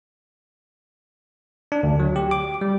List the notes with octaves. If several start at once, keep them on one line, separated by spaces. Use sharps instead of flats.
D4
D2
F#3
G4
D6
G3